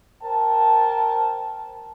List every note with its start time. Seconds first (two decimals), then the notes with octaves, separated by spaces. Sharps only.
0.23 A#4 C5 G5 A5